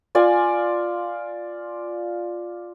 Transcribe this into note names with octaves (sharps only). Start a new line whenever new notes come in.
F4 D5 G#5